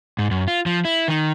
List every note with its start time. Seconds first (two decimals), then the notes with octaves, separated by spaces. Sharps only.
0.19 G#2
0.31 F#2
0.48 F4
0.66 F3
0.85 E4
1.08 D#3